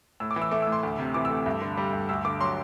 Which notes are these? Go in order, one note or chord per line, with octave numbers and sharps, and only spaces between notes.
A2 E6
D6
E3
E6
A3 D6
E6
A2
C6
D2
C3
E3 D6
E6
A3
G2
D3
G3
G2
D2 E6
D3 D6
F#3 C6